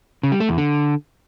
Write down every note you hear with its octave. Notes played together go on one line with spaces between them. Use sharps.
C#3
G3
A3
E2
D3